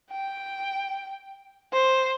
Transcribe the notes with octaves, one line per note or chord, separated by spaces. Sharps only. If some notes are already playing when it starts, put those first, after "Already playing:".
G5
C5